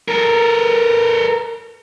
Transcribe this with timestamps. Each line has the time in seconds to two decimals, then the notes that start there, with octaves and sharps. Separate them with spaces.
0.08 A4 A#4